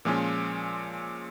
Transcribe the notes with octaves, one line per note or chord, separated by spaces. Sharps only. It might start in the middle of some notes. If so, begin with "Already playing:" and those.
A#2 F3 G#3 C#4 F4